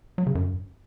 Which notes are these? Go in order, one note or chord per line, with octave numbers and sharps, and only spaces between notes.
F#3
C#3
F#2